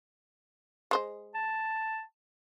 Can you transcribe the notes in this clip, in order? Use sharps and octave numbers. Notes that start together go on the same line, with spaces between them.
G#3 C5 D#5
A5